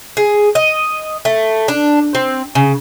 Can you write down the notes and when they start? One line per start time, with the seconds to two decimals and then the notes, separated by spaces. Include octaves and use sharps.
0.17 G#4
0.55 D#5
1.25 A3
1.68 D4
2.15 C4
2.55 C#3